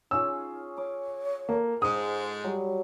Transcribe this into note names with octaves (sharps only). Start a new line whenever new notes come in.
C#4 D#4 F4 G#4 E6
C#5 D6
A#3 A4
G#2 G#3 C5 D#6
F#3 G3